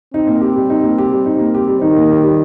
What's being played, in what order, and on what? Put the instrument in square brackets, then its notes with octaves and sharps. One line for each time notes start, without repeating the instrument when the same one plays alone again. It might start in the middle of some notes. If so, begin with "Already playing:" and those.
[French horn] C4 [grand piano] D#4
[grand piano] A#3
G4
G3
D#4
A#3
G4
G3
D#4
A#3
G4
G3
[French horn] D#3 [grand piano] D#4
[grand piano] A#3
G4
G3